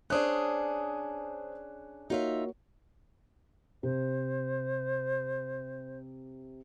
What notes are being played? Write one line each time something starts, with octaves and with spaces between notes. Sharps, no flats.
C#4 D4 G#4 C5 D#6 F#6
A#3 D#4 F4 F#4 C#5 E5
C3 C5